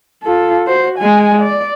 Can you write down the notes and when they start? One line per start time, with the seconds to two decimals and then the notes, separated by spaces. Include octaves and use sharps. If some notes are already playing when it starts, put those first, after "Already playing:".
0.23 F4 A4
0.67 F#4 C5
0.98 G#3 G#5
1.41 D5